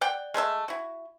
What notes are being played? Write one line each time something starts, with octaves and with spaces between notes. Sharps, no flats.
D5 F#5 G5
G#3 A3 C#5 E5
E4 F#4